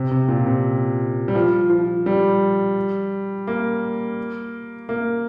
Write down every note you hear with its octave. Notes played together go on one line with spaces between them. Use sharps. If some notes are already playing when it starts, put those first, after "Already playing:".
Already playing: C3
C3
A#2
C3
G3
F3
F3
G3
A#3
A#3